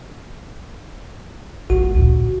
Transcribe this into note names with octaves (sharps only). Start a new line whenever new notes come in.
A3 A#3 F#4
D2 A#2